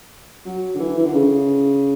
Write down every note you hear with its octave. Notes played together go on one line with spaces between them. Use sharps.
F#3
D3
E3
E3
D3
C#3